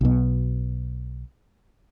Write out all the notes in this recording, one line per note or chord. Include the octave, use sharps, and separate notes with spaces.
B1 B2